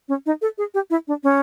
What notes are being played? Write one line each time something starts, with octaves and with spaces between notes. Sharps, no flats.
C#4
D#4
A4
G#4
G4
E4
D4
C#4